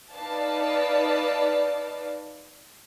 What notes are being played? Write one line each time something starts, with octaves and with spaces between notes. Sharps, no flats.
D#4 B4 D5 F5 A5